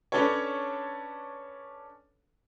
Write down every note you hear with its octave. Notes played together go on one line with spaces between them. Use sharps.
C#4 D4 A4 B4 C#5